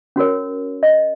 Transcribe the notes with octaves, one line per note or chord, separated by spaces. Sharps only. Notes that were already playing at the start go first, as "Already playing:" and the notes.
C#4 F#4 A#4 C#5
D#5